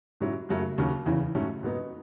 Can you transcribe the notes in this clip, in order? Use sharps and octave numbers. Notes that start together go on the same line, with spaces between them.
G#2 F#3 C#4 E4
F#2 C#3 F#3 A3
D#2 C#3 F#3 C#4
E2 C#3 E3
G#2 F#3 A3 C#4
G#2 F#3 B3 D#4